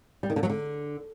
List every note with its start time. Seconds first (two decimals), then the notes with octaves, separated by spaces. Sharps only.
0.23 G3
0.30 D#3
0.36 D3
0.43 F#3
0.50 D3